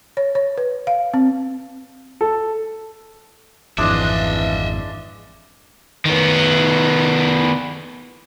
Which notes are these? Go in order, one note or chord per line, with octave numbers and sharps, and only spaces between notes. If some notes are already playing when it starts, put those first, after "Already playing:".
C#5
C#5
B4
F5
C4
A4
G#1 F2 E3 G#3 D4 D#5 E5
D#3 B3